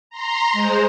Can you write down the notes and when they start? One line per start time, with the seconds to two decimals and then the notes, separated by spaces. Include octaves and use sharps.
0.10 A#5 C6
0.53 G#3 C5